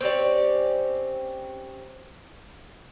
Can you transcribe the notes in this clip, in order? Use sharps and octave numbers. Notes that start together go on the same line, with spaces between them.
C4 C#4 G4 D5